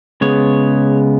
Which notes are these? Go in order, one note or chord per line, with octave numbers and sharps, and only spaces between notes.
C#3 G#3 B3 C#5